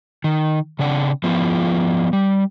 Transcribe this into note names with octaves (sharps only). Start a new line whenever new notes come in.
D#3
C#3 C4 D4 F#5
F3 B3 E4 F4
G3